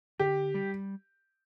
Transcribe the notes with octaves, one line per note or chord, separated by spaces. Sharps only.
D3 G4
G3